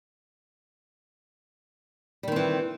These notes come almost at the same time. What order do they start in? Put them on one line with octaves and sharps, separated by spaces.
G3 D#3 C4 E3